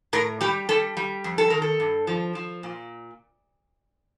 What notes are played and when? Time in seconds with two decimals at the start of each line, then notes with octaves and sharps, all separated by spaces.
0.13 A2 A#4
0.41 G3 G4
0.69 G3 A4
0.97 G3
1.24 F2
1.38 A4
1.50 D#3 A#4
1.62 A4
1.80 G2
2.07 F3
2.35 F3
2.63 A#2